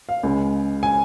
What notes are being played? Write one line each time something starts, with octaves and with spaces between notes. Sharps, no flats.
F5
C#2 C#3 G#3
G#5